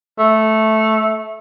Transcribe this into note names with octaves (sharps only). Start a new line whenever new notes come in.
A3